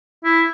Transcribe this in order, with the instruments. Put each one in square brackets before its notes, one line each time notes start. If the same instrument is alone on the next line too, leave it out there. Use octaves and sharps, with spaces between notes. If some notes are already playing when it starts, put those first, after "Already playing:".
[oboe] E4